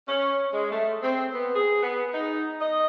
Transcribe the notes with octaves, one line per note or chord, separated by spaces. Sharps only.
C#4
G#3
A3
C4
B3
G#4
B3
D#4
D#5